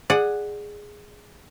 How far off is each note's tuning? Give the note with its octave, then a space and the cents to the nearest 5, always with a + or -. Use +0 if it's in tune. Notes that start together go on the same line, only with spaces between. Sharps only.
G#4 +0 D5 +20 F#5 +0